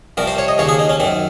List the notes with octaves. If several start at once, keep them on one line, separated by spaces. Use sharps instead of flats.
C2 C3 F3 A#4
C5
C#5
D#5
D#2 C#3 F3 C#5
G#4
D#4
C#4
F#2 D#3 C4